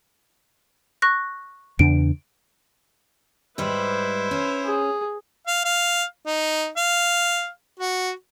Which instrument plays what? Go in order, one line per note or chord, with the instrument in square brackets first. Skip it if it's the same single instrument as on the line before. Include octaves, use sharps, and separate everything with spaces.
[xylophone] C#6 F#6 A#6
[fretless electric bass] E2 C#3 D4 [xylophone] D7
[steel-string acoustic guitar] G#2 G3 [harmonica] E4 C5 [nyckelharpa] B4
[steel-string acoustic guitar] C#4
[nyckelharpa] G#4
[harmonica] F5
F5
D#4
F5
F#4